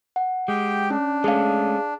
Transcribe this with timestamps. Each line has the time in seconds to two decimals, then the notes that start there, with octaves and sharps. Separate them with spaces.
0.16 F#5
0.48 G#3 G4 G5
0.90 C#4 D4
1.24 G#3 A3 C#4 G#4 F5